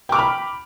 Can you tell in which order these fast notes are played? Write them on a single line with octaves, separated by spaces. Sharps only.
G5 D6 F6 B5